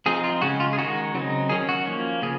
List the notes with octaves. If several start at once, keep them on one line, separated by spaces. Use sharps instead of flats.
F3 C4 D#4 G#4
F4
C#3 G#3 C#4 F#4
F4
G#4
D#3 G#3 D#4 F#4
C#3 F#3 C4 D#4
D#3 F#3 C#4 G#4
F#4
F3 A#3 C#4
C#3 F3 G#4